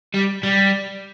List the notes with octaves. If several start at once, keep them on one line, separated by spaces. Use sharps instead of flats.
G3
G3